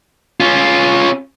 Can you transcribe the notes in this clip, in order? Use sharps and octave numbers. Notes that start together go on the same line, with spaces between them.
C#4 F4